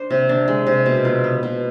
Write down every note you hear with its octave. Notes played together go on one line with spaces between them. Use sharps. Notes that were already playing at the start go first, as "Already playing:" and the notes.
Already playing: D4 C5
C3
D4
G#3
C3
B2
F4
B3
B2